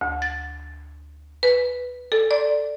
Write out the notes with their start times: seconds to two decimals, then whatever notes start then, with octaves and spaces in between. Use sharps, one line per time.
0.01 D2
0.22 A6
1.43 B4
2.12 A4
2.31 D5